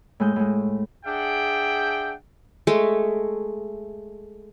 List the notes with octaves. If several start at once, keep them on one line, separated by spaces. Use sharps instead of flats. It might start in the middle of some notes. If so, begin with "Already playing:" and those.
A2 G#3 G6
A2 G#3
D4 G#4 E5 F#5 G5
G#3 A3